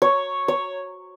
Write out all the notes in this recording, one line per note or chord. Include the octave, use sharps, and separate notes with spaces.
C#5
C#5